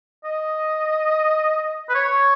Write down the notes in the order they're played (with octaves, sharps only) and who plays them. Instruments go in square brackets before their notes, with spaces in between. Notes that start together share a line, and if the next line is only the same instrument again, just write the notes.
[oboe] D#5
B4
C#5